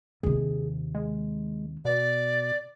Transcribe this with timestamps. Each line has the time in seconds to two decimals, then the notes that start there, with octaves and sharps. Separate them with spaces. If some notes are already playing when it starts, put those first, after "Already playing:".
0.23 D#2 C3 G#4
0.95 G#3
1.85 B2 D5